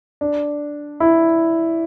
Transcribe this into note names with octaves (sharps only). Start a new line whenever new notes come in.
D4
E4